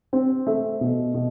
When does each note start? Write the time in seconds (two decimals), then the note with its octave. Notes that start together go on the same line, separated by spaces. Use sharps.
0.13 C4
0.47 A3 E5
0.81 B2
1.14 B2